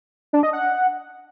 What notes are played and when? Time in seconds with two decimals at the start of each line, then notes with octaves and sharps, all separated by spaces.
0.33 D4
0.43 D#5
0.53 F#5